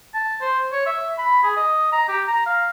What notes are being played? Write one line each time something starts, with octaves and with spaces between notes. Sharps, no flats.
A5
C5
C#5
E5
B5
G#4
D#5
A#5
G4
A#5
F5